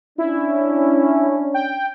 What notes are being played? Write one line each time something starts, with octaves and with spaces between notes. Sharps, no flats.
C#4 D4 E4
G5